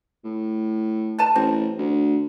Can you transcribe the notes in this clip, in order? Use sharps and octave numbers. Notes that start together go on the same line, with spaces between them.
A2
A4 B4 A5
A1 C4
D2